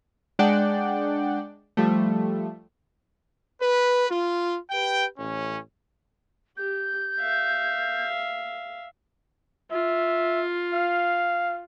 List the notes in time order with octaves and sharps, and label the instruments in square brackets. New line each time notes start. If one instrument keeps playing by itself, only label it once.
[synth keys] G#3 D4 D5 F#5 G5
F3 G3 A3
[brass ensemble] B4
F4
G4 B4 G5
A1 A2 C#4
[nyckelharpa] G4 [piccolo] G6
[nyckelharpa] E5 F5
[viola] F4 [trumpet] E5
[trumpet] F5